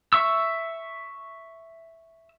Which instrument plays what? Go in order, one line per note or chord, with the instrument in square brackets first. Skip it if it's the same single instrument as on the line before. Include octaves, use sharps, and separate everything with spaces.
[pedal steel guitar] E5 C#6 E6